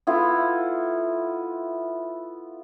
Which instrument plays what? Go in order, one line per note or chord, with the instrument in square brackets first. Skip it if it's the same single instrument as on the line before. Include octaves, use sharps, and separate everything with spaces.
[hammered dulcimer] B3 E4 F4 A4